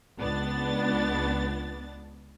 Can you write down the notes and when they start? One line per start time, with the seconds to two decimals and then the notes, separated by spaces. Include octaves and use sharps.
0.18 C#2 B3 D4 A6